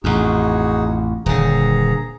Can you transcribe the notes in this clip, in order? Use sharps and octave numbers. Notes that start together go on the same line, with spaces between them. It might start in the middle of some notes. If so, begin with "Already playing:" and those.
A1 F2 D#4 F#4 G#4
D#1 D3 G#4 A#5